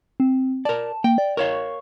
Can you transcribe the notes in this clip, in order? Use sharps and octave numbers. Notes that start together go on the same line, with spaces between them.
C4
A#4 D5 A5
A#3 G5
D5
A#4 C#5 F5 C#6